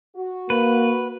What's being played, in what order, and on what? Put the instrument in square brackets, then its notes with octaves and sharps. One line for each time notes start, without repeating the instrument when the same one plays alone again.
[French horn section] F#4
[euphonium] A#3 [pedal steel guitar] B4